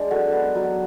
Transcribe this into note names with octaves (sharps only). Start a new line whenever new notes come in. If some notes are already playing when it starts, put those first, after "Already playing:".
Already playing: G#3 D4
F#3 F#4 A4
B3
F#3